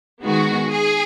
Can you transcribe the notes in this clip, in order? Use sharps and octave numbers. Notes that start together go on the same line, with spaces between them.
D#3 G#3 B3 F#4
G#4